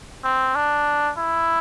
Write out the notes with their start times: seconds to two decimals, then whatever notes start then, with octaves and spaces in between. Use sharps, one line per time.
0.24 C4
0.55 D4
1.18 E4